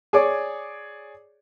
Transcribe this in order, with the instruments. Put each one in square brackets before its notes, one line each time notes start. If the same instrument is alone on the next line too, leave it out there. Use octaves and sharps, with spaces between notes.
[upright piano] G#4 C#5 D5 D6